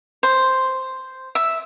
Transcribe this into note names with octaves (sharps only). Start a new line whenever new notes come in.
C5
E5